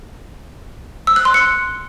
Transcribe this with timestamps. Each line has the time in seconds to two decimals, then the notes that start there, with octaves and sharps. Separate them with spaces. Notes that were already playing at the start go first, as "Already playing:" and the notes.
1.07 E6
1.16 F#6
1.25 C6
1.34 C#7